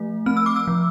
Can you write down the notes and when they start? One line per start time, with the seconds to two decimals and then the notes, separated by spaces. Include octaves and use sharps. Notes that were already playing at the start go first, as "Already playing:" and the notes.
Already playing: F3 A3
0.26 C4 F6
0.37 E6
0.46 D6
0.56 E6
0.67 F3